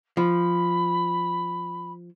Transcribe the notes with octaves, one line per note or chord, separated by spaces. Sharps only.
F3 B5